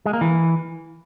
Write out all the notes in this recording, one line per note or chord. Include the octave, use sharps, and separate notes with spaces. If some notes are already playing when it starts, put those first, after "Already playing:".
G#3
A#3
E3